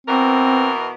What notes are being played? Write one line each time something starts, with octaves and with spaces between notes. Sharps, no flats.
B2 E3 C4 A#4